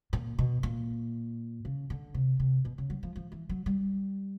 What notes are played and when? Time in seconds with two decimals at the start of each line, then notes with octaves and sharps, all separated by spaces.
0.13 A#2
0.39 B2
0.63 A#2
1.65 C#3
1.90 D3
2.14 C3
2.40 C3
2.65 B2
2.78 C#3
2.90 F#3
3.03 F3
3.16 F3
3.32 E3
3.49 F#3
3.66 G3